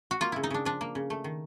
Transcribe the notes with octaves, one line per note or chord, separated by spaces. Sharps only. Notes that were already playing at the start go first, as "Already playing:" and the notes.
F#4
A#3 F4
C#3 E4
D#4
C#3 D4
F3 D4
A#3
C#3
A3
D#3